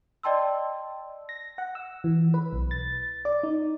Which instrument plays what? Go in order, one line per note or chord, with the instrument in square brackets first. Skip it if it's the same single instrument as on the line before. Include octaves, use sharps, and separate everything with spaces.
[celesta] D5 D#5 G5 A5 C6 E6
[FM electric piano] A#6
F#5
E6
E3
B4
B1
A6
D5
D#4